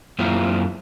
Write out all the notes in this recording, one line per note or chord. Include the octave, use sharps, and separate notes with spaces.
F#2 A#3 C4 E4 F4